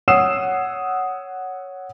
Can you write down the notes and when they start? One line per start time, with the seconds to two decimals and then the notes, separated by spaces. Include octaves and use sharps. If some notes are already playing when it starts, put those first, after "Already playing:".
0.08 C#5 F#5 D#6 E6 C7 E7